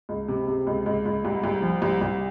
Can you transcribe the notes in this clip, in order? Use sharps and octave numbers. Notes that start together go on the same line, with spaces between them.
C#2
C3
C3
C#2
C#2
C#2
C2
C2
F3
C2
C2